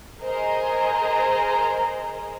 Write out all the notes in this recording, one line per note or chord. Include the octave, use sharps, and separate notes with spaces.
G#4 A#4 C5 D#5 A#5